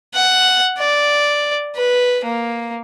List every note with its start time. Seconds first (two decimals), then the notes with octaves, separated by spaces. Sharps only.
0.14 F#5
0.78 D5
1.76 B4
2.25 A#3